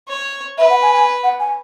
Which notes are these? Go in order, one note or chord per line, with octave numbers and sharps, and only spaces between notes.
C#5
B4 E5
F#5
G#5
G#5
F#5
G#5